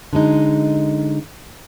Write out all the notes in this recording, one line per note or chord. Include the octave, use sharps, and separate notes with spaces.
D3 F#3 G#3 D#4